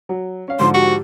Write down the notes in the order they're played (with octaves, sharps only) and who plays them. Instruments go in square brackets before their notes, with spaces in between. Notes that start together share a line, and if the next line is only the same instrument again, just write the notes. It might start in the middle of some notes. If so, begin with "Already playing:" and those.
[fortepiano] F#3
C#4 F5
[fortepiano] G#2 D3 F3 [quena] C6
[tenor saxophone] F#4 [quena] G4